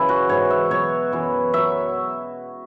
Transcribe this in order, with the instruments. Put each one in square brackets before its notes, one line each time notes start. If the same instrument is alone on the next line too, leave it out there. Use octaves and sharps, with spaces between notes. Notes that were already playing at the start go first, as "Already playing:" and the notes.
Already playing: [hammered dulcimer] F#2 C#3 E3 E4
F#4
G#2 E3 C#5
E5
B2 F#3 C#5
F#2 E3
B2 F#3 E5